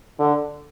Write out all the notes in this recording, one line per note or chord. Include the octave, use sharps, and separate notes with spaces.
D3